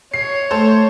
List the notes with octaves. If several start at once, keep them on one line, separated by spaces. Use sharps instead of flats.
C#5 C7
A3 A4 C5